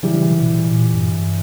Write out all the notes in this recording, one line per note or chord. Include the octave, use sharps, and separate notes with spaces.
C#3 E3 G3
B2
B2
A#2
A#2
G2